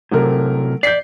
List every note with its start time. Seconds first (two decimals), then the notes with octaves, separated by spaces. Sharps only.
0.11 A2 C3 F#3 A3 A#4
0.83 D5 G6 B6 C7